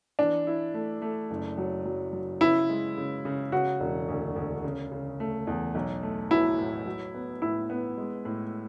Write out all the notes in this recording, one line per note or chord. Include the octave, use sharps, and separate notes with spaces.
E3 D4
E4
A3
A3
F#1
F#3
F#3
F#3
C#3 E4
G#3
C#3
C#3
C#3 F#4
E1
D2
D2
C#3
C#3
A3
E2
B1
A3
F#3 E4
A2
F#3
B3
A2 E4
B3
G#3
A2